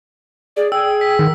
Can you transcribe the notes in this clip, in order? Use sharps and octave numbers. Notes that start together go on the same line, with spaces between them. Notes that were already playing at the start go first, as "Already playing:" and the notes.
G#4 D5
G#4 G5 E6
B6
D#3 A#4